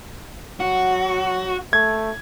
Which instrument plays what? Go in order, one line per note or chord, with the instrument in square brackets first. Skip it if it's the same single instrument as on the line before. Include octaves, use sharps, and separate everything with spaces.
[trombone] F#3 [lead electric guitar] F#4
[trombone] A3 [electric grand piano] G#6